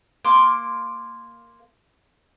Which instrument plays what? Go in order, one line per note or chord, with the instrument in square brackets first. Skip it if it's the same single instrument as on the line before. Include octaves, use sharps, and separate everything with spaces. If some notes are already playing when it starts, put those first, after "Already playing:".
[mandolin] A#3 C6 D6